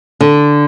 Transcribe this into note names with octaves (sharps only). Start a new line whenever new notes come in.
D3